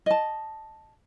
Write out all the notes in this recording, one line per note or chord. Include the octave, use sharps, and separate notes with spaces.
D#5 A5